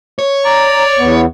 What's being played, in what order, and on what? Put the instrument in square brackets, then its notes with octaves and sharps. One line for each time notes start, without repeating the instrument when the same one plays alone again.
[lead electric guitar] C#5
[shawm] D5 [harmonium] A#5
[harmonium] E2 B3